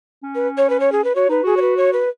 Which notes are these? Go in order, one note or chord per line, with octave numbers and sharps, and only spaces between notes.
C#4
B4
C#5
B4
C#5
G#4
B4
F#4 C#5
D#4 B4
F#4 G#4
C#5
B4
C#5
B4